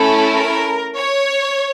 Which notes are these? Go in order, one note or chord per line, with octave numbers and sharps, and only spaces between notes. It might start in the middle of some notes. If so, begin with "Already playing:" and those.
Already playing: A3 C#4 E4 A4
A#4
C#5